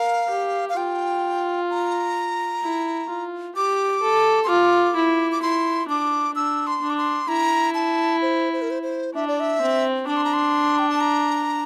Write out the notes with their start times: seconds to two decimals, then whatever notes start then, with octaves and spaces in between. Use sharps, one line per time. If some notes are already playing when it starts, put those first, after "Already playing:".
Already playing: A#4 F5
0.30 G4
0.69 F5
0.77 F4 G5
1.70 A#5
2.63 E4
3.10 F4
3.56 G4 D6
4.02 A4
4.44 C6
4.49 F4 D6
4.96 E4
5.32 D6
5.42 E4 C6
5.88 D4 D6
6.35 D4 E6
6.67 C6
6.82 D4
6.90 D6
6.97 C6
7.28 E4 A#5
7.75 A5
8.22 C5
8.53 C5
8.62 A#4
8.70 C5
8.83 C5
9.14 D4 E5
9.28 D5
9.40 E5
9.62 C4
10.07 D4 D6
10.17 C6
10.25 A#5
10.33 C6
10.79 G5
10.89 A5
11.01 A#5